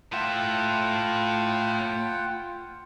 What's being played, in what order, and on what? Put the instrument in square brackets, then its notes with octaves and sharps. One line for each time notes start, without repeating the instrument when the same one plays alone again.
[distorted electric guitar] A2 E5 [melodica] F4 F#5 G5